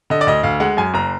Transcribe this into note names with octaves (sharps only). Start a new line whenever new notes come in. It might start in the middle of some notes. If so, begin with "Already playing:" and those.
D3 D#5
D5
D2 D#5
D2 F5
G#3 F#5
F#2 G#5
F#1 A#5